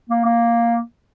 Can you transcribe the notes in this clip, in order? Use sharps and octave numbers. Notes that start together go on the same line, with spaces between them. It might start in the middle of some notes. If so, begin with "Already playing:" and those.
A#3
A#3